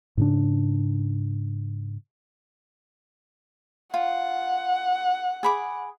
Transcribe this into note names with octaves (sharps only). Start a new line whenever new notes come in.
G#2 C#3 D4
F4 F#5
G#4 B5 D6